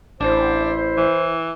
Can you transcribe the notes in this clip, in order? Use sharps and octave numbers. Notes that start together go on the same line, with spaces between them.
A1 D4 E4 C5
E3